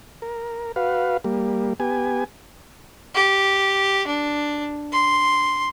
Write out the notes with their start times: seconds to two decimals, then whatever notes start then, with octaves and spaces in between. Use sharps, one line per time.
0.22 A#4
0.76 F#4 B4 F5
1.24 G3 A#3
1.80 B3 G4 G#5
3.15 G4
4.07 D4
4.93 C6